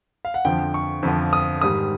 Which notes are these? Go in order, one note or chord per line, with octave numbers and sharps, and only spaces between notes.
F5
F#5
F2 D3 F3 G5
C#6
F2 D3 F3
D#6
G#2 D#3 G3 D#6